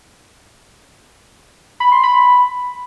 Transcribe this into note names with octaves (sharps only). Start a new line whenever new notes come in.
B5
C6
B5